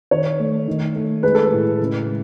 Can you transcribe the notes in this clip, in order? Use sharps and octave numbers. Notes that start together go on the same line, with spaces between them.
D#3 C#5
A3
D#3
A3
G#3 B4
A4
B4
A2
C#3
G#3